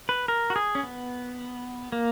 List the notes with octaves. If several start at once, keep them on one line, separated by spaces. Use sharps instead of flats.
B4
A#4
F#4
G#4
C#4
B3
A#3